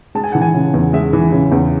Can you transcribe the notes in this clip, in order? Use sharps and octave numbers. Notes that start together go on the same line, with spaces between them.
G#3 A5
G#5
E3 F#5
G#5
C#3
E2
G#3 E5
E3
C#3
E2